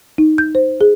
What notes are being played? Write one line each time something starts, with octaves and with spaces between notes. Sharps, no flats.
D#4
G6
C5
G#4